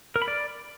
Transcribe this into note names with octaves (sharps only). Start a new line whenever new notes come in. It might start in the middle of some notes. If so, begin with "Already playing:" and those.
A#4
B5
D5